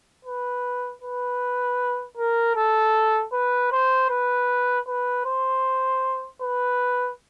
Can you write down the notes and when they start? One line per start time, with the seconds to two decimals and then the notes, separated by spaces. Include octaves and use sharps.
0.25 B4
1.02 B4
2.17 A#4
2.56 A4
3.33 B4
3.72 C5
4.10 B4
4.88 B4
5.26 C5
6.41 B4